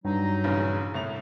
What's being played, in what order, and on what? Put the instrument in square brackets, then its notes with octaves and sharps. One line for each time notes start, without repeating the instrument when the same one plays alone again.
[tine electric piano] G2 [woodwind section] F#3 D#4
[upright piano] A#1 C#3 E3
C2 A2 F7